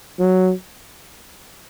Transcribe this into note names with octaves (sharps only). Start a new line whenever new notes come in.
F#3